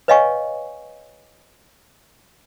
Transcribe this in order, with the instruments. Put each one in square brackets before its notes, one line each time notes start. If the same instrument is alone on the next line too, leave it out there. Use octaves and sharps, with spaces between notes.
[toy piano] B4 C#5 D#5 F5 G#5 C#6